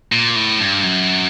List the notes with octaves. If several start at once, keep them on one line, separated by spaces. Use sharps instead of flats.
A#2
A2
G2
F#2